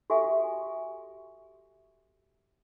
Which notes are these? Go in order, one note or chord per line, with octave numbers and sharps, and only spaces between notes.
F#4 G4 A4 E5 G#5